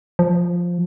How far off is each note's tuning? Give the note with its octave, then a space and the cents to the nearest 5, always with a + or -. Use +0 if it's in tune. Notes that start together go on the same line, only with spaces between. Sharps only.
F3 +5